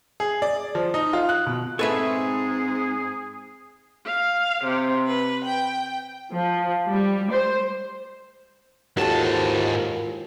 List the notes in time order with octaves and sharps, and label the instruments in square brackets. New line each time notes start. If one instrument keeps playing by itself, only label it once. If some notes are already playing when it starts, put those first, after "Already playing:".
[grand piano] G#4
D5
F3
D#4
F4
F#6
B2
[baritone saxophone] G#2 [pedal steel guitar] C4 G#5 C#6 [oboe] G#4 [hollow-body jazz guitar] A4 B4 E5
[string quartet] F5
C3
B4
G5
[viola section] F3
G3
C5
[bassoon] D#2 [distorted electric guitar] G#2 A5 [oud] E3 F3 F4 [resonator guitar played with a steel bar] F#4 A4